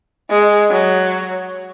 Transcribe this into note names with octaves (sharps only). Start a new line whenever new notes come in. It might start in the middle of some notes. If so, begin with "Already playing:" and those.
G#3
F#3